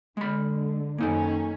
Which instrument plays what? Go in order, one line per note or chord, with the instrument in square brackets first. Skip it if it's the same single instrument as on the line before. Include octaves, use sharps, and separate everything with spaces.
[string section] D3 [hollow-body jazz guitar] G#3 B5
[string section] F#2 D#3 C#4 [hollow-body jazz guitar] A#3 D#4 A4